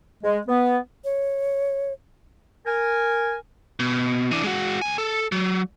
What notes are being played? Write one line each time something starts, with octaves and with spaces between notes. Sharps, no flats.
G#3
B3
C#5
A#4 G#5
B2
E3 D4
G#3 F#4
C#2 G#5
A4
F#3